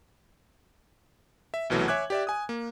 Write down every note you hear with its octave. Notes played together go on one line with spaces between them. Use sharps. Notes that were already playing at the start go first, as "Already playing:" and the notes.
E5
C2 B2 E3 F#3 A3
C#5 E5 G#5 D6 F#6 G#6
G4 D5 E5
G#5 D#6
A#3